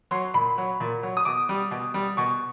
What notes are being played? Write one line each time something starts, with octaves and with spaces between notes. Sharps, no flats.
F#3 C6
A#2 B5
F#3
A#2
F#3
D#6
B2 D6
G3
B2
G3
B2 C#6